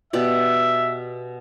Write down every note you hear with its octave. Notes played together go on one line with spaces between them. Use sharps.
B2 G4 D5 E5